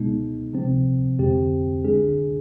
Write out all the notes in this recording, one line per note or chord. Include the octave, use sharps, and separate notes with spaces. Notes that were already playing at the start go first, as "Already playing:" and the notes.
Already playing: B2 G#3 B3 D#4
C3 F3 C4
F2 D3 G#3 C4 G4
D3 G#3 D4 G#4